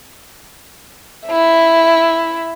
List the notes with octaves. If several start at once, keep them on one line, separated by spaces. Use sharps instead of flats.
E4 E5